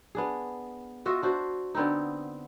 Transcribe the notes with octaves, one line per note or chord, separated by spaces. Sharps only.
B3 D4 G#4
F4 F#4 D#5 E5
D4 F#4 C5
D3 B3 C4 D#4